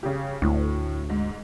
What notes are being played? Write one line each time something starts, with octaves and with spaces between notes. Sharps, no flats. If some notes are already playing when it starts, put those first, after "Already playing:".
C#3 G4
D2 A2
G#2